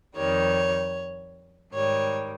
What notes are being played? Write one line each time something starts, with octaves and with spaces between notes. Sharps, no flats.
F2 D#3 G3 C#5
G#2 D#3 G3 C#5